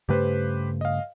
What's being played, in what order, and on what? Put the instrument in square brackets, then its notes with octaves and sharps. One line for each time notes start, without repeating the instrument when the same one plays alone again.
[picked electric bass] G2 C#3 A3 [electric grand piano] G4 B4 C5
[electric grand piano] D#5 F5